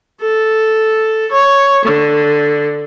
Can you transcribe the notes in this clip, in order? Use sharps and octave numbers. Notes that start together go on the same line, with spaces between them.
A4
C#5
D3